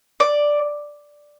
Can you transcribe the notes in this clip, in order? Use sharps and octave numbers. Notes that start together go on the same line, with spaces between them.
D5